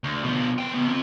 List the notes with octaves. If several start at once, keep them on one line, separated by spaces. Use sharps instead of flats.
D2
B2 F3
B3 G5
C#3 B3
C4 F4